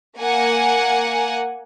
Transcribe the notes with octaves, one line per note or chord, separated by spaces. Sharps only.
A#3 F#5 G#5